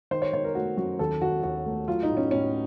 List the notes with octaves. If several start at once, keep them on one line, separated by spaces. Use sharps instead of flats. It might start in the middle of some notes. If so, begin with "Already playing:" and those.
D#3 C5
C#5
D#3 C#5
A#4
A3 F#4
F#2 F#4
D#2 A4
D#2 F#4
D#2 F#4
A3
F#3 F4
D#4
A2
C#4
A2 C#4